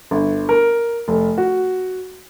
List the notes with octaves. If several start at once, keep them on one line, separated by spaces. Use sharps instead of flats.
G1
A#4
F1
F#4